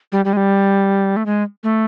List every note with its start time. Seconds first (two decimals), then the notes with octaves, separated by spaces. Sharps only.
0.12 G3
0.25 G3
0.33 G#3
0.37 G3
1.16 A3
1.26 G#3
1.63 A3